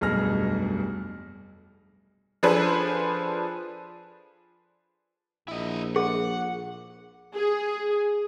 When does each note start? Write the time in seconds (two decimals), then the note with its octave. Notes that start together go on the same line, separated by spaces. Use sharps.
0.01 F1 B1 G2 G#4 F6 A#6
2.43 F3 D4 G#4 A4 B4 C5
5.48 A#1 E4 D#5
5.96 G#4 F#5
7.34 G#4